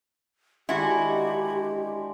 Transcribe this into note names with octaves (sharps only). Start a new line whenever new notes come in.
D3 D#3 G#3 E4 F#4 G4